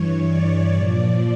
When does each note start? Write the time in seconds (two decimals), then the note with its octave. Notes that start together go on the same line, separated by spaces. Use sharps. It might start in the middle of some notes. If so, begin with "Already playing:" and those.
Already playing: G2 E3 C#5
0.27 D5
0.75 A#2 F3